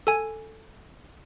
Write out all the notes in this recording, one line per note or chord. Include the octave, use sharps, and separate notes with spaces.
A4 G#5